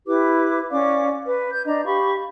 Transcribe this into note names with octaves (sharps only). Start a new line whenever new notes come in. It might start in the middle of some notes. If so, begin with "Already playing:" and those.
E4 G4 B4 D6
C#4 D5 F5 D6
B4
G6
D4 D#5 A#5
G4 F5 B5 C#6